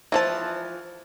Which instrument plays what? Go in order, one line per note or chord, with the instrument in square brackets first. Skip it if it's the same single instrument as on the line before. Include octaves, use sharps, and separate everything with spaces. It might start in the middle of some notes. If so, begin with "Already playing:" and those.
[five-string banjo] E3 F3 A5